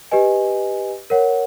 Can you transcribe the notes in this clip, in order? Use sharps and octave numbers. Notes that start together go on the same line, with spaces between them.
G4 B4 D#5 G#5
A#4 C#5 F#5